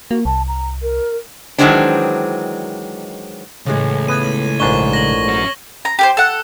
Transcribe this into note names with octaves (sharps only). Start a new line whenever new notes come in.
A#3 F#4
C2 A5
A#5
A#4
D#3 E3 F#3 G#3 C4 D4
C#2 A2 E3 G#3
B3 G#6 D#7
A#1 G#2 D4 C#6 G7
A#6 F#7
C#4 F#4
A#5
G4 A#4 C5
A4 F#5